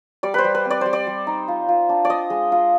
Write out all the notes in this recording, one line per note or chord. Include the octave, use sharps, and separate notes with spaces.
G3 D5
B4 C5
G3
B4
C4 D5
G3 C5
D5
G3
D#4
F4
F4
D4
D5
F4 D#5
G#3
F4